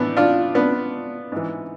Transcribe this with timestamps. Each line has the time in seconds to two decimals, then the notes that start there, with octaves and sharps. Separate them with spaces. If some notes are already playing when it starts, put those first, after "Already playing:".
Already playing: A2 E3 B3 D4
0.16 D4 F4
0.55 B3 D4
1.32 G#2 E3